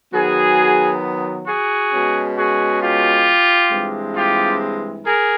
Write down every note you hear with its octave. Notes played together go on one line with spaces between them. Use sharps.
D#3 F#3 B3 F#4 G#4
F#4 G#4
B2 G#3 C#4
F#4 G#4
F4 G4
G2 E3 G#3 C4
F4 G4
G#4 A#4